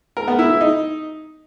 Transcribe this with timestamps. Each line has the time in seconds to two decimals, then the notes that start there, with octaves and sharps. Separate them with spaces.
0.17 A#4
0.28 B3
0.39 E4
0.50 E4
0.61 D#4